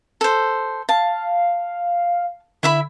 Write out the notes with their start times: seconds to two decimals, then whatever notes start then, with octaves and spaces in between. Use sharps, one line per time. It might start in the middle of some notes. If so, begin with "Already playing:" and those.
0.21 A4 C5
0.89 F5 A5
2.63 D3 E4 E5 B5